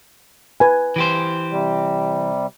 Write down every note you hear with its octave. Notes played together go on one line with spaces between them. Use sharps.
B4 G#5
E3 G4 C5
C3 G3